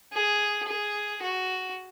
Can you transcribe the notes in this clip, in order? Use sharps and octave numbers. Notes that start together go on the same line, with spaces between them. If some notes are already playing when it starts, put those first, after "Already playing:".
G#4
G#4
F#4